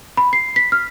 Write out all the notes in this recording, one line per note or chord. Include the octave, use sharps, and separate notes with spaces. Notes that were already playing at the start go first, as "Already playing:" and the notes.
B5
C7
B6
F6